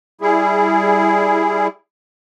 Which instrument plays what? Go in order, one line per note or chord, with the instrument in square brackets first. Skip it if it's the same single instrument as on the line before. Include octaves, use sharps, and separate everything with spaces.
[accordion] G3 E4 G#4